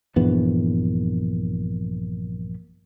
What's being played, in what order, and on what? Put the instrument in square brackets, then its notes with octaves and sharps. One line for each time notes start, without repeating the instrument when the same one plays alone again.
[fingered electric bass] A#1 G2 E3 B3